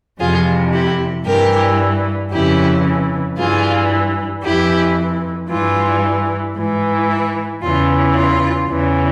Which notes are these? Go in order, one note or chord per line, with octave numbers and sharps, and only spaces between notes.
F2 C3 E3 F4 G#4
E4 G4
G2 E3 G4 A#4
F2 C#3 E3 E4 G4
G2 E3 F4 G#4
F2 E3 E4 G4
G2 E3 F4
G#2 E3
E4
E2 C#3 E3 F4
F4
E2 C#3 E3